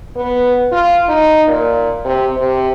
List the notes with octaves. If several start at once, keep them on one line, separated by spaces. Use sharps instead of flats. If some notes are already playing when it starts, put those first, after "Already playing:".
B3
F4
D#4
A#2
C3
C3